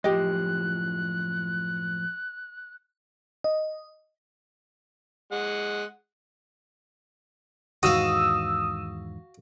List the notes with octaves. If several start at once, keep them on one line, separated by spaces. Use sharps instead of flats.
F#2 A2 F3 G4 D#5 F#6
D#5
G#3 F#5
E2 G#2 D#3 F#4 F5 D#6 E6